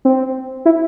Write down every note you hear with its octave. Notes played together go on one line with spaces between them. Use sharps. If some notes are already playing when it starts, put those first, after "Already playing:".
C4
E4